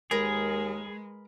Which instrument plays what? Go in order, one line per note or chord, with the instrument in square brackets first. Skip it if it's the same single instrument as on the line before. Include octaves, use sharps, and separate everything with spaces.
[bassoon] D#2 [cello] G#3 [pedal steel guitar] G#4 [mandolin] A#4 B4